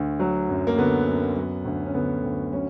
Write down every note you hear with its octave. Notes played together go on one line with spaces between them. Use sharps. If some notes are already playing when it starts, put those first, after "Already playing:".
Already playing: D2
F#3
F#2
A#3
D3 B3
F#2
F#3
D2
C#4
D3 B3
D2
F#3 C#4